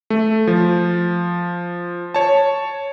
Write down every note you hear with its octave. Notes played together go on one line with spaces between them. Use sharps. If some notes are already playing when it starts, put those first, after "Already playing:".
A3
F3
C#5 A5